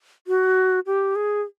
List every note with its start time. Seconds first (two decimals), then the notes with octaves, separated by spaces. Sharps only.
0.27 F#4
0.86 G4
1.16 G#4